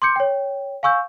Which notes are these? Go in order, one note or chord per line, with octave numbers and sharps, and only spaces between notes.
C6 D6 G6 C#7
C#5 G5
F5 G#5 C#6 E6 G6